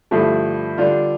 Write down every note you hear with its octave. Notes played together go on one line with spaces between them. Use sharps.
G2 D3 F3 A3 E4
D3 G3 D4 F4